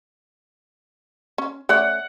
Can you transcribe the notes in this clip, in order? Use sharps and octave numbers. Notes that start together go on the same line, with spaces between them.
C#4
A3 C#4 D5 F#5